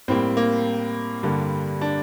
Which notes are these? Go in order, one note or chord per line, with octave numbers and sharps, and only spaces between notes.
A2 G3 A#3 C4
A#3
G2 D3 G3 A#3
D4